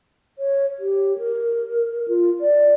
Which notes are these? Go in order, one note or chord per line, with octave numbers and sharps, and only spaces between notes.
C#5
G4
A#4
F4
D5